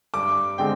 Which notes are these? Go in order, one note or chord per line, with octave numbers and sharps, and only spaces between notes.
G2 D6
D3 G#3 C4 G5